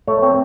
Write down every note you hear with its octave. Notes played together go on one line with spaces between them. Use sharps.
A3 C#5
C4 C#5